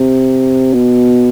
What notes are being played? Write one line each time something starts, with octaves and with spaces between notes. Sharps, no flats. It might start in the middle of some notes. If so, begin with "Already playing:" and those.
Already playing: C3
B2